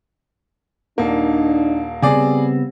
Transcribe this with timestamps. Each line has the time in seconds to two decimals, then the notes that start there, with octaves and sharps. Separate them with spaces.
0.98 D#1 A#3 D4 D#4
2.02 C#3 G3 B3 C4 G#4 D5